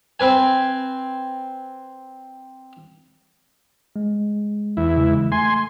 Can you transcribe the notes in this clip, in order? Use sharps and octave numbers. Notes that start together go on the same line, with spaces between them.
C4 B4 G#5
G#3
E2 E4
C#3 E3 G#3
A3 G#5 C6